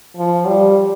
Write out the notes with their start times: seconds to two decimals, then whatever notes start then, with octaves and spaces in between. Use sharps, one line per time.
0.17 F3
0.46 G3